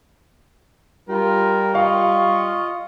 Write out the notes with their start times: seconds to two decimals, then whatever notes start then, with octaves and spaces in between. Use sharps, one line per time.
1.09 G3 F4 A#4
1.75 F4 D#5 F5 C#6